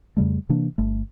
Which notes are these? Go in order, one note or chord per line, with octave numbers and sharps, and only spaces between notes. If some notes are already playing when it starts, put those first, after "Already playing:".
F2 C#3 G3 A3
C3 E3 A#3 D4
G1 A3